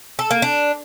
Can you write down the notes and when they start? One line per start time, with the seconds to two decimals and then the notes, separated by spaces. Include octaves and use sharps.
0.19 A4
0.31 A#3
0.42 D4